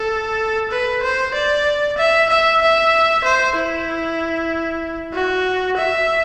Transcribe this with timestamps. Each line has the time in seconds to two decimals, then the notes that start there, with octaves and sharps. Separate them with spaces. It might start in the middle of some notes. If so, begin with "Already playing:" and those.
Already playing: A4
0.71 B4
1.03 C5
1.34 D5
1.98 E5
2.30 E5
2.61 E5
3.24 C5
3.56 E4
5.13 F#4
5.77 E5